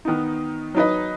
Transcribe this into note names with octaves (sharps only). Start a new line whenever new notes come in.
D#3 B3 D#4
F#3 D#4 B4 D#5